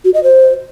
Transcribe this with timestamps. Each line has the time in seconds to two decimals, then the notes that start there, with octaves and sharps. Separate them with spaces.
0.05 F#4
0.14 D#5
0.23 C5